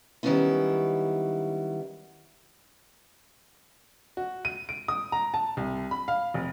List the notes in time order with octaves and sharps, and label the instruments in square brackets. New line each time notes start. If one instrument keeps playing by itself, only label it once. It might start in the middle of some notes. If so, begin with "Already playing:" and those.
[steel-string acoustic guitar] D#3 F#3 G3 B3 C#4 E4
[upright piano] F#4
D#7
D7
D#6
A#5
A5
C2
B5
F5
F1